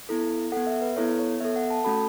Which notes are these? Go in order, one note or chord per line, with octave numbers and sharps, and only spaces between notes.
B3 E4 A4
B3 A4 F#5
E5
B4
B3 E4 A4 C#5
C#5
B3 A4 E5
F#5
A5
A3 C#4 F#4 A4 B5